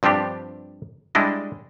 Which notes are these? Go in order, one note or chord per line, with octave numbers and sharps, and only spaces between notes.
G2 F3 C4 D4 G4
G3 G#3 D4 E4 D#5